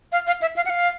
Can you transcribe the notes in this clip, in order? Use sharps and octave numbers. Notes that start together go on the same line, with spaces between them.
F5
F5
E5
F5
F#5
F5